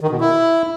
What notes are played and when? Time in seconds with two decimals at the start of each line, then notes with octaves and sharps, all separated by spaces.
0.01 D#3
0.11 B2
0.21 E4